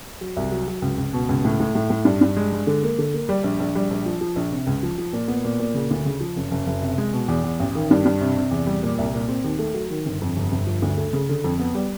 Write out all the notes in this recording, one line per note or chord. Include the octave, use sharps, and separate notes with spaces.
F#3
C2
F#3
F#3
C#2
C#2
B2
C#2
A2
A2
A2
A2
G2
G2
G#3
G#3
D3
A#3
D3
A#3
G3
A#1
A#1
G3
A#1
F3
F3
A#1
C3
C#2
F3
F3
A#2
B3
A#2
A#2
C#3
D2
C#3
F3
F#1
F#1
F#1
C3
G#3
B2
E2
E2
A1
D#3
G2
G2
C3
C3
E2
G3
A#2
C2
A#2
C4
D#2
A3
F#3
D#3
G1
F2
G1
G1
F3
D2
A3
C#3
D3
F2
B3
G3